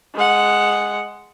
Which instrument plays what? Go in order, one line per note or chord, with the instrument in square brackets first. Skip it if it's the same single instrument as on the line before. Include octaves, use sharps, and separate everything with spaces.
[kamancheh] G#3 F#5